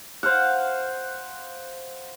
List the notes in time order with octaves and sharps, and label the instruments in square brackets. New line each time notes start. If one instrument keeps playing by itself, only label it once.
[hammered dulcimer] C5 F5 F#5